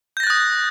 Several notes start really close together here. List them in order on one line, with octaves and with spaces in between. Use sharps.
G6 A#6 A6 F#6 D#6